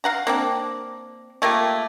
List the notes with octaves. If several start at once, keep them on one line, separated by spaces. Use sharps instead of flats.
F5 F#5 A#5
A#3 C4 D4
A3 A#3 F4 G4